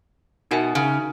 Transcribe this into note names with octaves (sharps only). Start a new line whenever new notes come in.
B2 D#4 F#4 A#4 E5 G#5
C#3